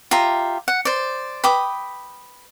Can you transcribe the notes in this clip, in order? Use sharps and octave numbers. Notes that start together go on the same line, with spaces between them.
F4 G4 E5 A#5
F#5
C5 D5
B4 G5 D6 D#6